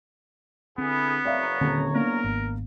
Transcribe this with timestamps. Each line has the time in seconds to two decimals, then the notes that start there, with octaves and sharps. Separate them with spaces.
0.78 D3 B3 C4 E4 G#4
1.25 F#1 C#5 D5 E5 F5 A#5
1.61 D#1 D3 C4 C#4
1.94 A#3 B3 D4 A#4
2.24 G#1